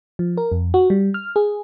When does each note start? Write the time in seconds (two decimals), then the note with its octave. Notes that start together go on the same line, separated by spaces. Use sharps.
0.19 F3
0.37 A#4
0.52 F2
0.74 F#4
0.90 G3
1.14 F6
1.36 G#4